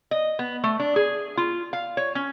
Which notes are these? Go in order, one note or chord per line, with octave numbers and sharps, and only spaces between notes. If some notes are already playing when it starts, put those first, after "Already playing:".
D#5
B3
A3
D4
G#4
F4
F5
C#5
C#4